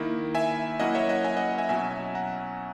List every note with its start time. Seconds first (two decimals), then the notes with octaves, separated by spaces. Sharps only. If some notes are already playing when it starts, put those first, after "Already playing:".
Already playing: D#3 A#3 E4
0.35 E5 G#5
0.80 F#3 A#3 C#4 E4 D#5 F#5
0.95 C#5 E5
1.09 D#5 F#5
1.24 E5 G#5
1.37 D#5 F#5
1.58 E5 G#5
1.69 B2 F#3 C#4 E5 G#5
2.15 F#5 A#5